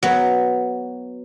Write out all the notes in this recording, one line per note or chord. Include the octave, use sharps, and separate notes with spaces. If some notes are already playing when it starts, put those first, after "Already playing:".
F#3 B3